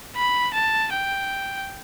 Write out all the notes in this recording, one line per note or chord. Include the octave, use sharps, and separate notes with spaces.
B5
A5
G5